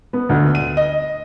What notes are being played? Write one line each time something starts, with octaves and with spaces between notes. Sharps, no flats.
B3
D2
D#7
D#5